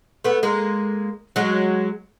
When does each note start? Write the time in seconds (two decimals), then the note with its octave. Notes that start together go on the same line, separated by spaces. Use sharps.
0.24 A3 B3
0.43 G#3 A#3
1.36 F#3 G#3